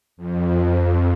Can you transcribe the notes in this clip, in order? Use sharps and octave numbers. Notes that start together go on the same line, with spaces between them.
F2